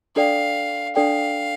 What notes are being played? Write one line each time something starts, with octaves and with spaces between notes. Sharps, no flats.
D4 A4 D5 F5 G5
D4 A4 D5 F5 G5